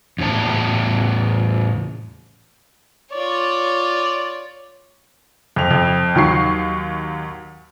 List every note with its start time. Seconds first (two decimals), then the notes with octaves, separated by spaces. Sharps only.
0.19 E2 A2 C#5 A5
3.12 F4 C#5 D5
5.56 F2 F7
5.71 F2
6.15 D#2 F#3 C#6 C7